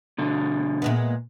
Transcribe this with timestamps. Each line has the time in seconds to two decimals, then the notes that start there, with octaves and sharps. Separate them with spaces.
0.18 B2 D3
0.82 A#2 G#3 B3